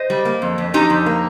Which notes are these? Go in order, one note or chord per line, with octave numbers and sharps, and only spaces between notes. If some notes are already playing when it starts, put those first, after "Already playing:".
Already playing: C5 D#5
G3
A#3
F2
F2
F2 D#4 G4
F2
A#3